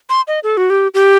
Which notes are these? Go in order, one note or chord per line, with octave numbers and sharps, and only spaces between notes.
C6
D#5
A4
F#4
G4
G4